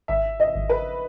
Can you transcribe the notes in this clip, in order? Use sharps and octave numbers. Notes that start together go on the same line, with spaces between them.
G#1 E5
D#5
G#1
B4